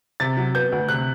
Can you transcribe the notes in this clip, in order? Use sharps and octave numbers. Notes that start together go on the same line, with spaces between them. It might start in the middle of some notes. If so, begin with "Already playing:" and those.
C3 A6
F#3
B3 G6
D2
C3 F#6